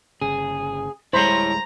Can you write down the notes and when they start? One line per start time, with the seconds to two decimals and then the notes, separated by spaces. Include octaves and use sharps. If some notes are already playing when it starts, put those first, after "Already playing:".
0.21 G1 C#3 G#4
1.13 D1 G3 G#3 E4 C5 C#5 A#5 B5